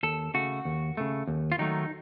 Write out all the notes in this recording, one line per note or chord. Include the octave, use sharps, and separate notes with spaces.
D#2 A4
C#3 A3 F#4
D#2
C#3 A3
D#2
F4
D#3 F#3 A3 D#4